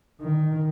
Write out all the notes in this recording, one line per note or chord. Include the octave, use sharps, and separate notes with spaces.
D#3